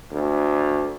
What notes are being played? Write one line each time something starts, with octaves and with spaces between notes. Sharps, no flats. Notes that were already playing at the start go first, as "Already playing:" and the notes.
D2